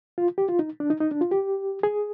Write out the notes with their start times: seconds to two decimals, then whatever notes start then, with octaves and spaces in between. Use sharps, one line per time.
0.18 F4
0.38 G4
0.49 F4
0.59 D#4
0.80 D4
0.90 D#4
1.01 D#4
1.11 D4
1.21 F4
1.31 G4
1.83 G#4